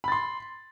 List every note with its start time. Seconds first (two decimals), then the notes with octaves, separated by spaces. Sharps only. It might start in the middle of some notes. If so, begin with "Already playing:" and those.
0.04 B5
0.08 A6
0.12 C6